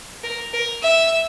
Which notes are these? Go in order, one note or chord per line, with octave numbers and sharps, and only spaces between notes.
A#4
A#4
E5